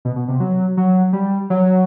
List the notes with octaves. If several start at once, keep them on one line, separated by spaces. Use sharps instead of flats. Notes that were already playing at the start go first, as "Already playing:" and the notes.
B2
B2
C3
F#3
F#3
G3
F#3